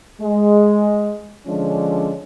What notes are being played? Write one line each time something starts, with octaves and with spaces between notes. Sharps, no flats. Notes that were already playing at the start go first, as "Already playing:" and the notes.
G#3
D3 F3 G#3 C#4 D4